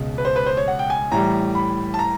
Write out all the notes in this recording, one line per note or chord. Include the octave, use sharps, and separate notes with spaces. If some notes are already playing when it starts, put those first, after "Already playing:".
Already playing: C#2 B2 G#3
B4
C5
B4
C5
C#5
F#5
G5
G#5
A2 E3 G3 A#5
B5
A5
A#5